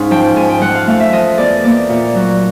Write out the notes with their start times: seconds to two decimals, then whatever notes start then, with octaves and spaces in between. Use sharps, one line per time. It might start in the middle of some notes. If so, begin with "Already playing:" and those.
Already playing: G#2 C#4 F5
0.11 F3 G5
0.24 G5
0.36 G#2 G#5
0.49 G5
0.61 F3 F#5
0.75 F5
0.87 A3 F5
1.00 E5
1.12 F3 D#5
1.38 E2 D5
1.64 A#3 D5
1.89 A#2
2.15 F#3